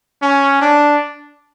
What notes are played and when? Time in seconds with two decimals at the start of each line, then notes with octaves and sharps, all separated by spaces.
0.22 C#4
0.61 D4